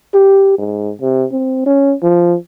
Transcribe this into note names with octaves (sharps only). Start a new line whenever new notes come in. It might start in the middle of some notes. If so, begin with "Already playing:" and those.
G4
G#2
C3
C4
C#4
F3